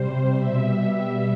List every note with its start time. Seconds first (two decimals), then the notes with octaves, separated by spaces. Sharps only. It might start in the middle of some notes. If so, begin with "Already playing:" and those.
Already playing: C3 G3 C5
0.36 B2 G3 E5
0.77 E5